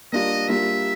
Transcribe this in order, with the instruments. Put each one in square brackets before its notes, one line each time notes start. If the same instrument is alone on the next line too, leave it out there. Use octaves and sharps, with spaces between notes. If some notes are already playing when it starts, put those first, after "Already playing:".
[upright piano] G3 A#3 D4 F4 [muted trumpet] D#5
[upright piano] G3 A#3 D4 F4 [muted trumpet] E5